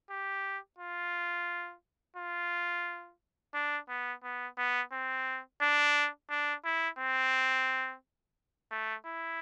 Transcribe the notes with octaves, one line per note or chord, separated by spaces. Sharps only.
G4
F4
F4
D4
B3
B3
B3
C4
D4
D4
E4
C4
A3
E4